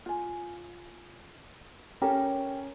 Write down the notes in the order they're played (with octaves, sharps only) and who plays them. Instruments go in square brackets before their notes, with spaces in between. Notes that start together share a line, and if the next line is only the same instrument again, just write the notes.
[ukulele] F4 G#5
[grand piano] C#4 [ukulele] G4 A4 A#4